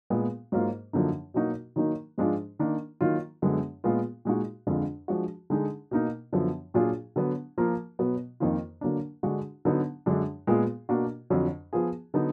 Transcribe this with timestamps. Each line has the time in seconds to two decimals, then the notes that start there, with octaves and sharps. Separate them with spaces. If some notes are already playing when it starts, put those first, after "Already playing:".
0.10 A#2 G#3 B3
0.52 G#2 F#3 A#3 F4
0.93 F#2 D3 F3 A#3 D#4
1.34 B2 F#3 A#3 D#4 F#4
1.76 D#3 F#3 A#3 D#4
2.18 G#2 F3 G#3 D4 F4
2.59 D#3 A#3 D4
3.01 D#3 F#3 A#3 F4
3.42 F#2 D3 G#3 B3
3.84 A#2 G#3 B3 F4
4.25 A#2 G#3 D#4 F#4
4.67 F2 D3 G#3 D4 F4
5.08 F3 G#3 D4 F#4
5.50 D3 G#3 D#4 G#4
5.91 B2 A#3 D#4
6.33 F#2 D3 F3 B3
6.74 A#2 F#3 D4 F4 G#4
7.16 D3 F#3 B3
7.58 F3 A#3 F4
7.99 B2 F#3 B3
8.40 F2 D#3 A#3 F4
8.81 D3 F#3 A#3 D4
9.23 D3 G#3 D4 F#4
9.65 D3 F#3 B3 D#4
10.06 F#2 D3 G#3 D4
10.47 A#2 G#3 B3 F4 G#4
10.89 B2 A#3 D4 F#4
11.30 F2 D3 F#3
11.73 F3 B3 F4 G#4
12.14 D3 F#3 B3 D#4